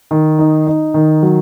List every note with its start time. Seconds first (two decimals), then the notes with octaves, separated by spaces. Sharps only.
0.11 D#3
0.39 D#4
0.67 D#4
0.94 D#3
1.23 F#3